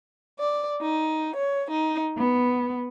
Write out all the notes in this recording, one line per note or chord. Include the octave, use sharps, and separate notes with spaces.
D5
D#4
C#5
D#4
B3